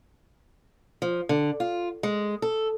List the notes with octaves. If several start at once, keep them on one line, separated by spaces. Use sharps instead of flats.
F3
D3
F4
G#3
A4